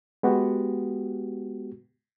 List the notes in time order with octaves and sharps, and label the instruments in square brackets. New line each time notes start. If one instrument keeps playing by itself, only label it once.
[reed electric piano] G#3 B3 F#4 G4